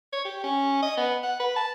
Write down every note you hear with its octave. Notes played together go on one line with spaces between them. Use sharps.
C#5
G4
C#4
D#5
B3
F#5
B4
A5